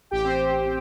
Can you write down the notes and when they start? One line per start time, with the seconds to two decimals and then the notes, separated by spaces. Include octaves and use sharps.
0.11 A1 G4 G5
0.24 C4 C5